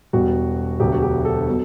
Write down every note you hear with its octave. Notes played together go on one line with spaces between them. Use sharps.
E1 E2 B2 G3 F#4
E1 D2 D3 F#3 G4
F#4
G4
A4
B2 F#3